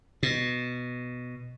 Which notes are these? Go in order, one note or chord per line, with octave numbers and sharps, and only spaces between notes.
B2